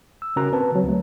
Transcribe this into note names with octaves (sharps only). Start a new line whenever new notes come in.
E6
C#3 C#4 F#4 A#4 A#5 F#6
C4 B4 A5
D3 F#3
C#2 F#3 A3